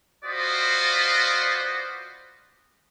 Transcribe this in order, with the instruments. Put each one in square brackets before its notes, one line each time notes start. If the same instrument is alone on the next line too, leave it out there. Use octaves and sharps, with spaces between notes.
[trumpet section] F4 F#4 B4 C5 D5 D#5